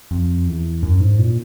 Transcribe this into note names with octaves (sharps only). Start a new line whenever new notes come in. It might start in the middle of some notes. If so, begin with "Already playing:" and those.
F2
E2
F#2
G#2
A#2